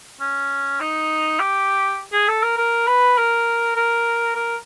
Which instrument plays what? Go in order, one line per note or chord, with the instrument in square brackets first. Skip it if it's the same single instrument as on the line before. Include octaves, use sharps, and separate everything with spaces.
[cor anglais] C#4
D#4
G4
G#4
A4
A#4
A#4
B4
A#4
A#4
A#4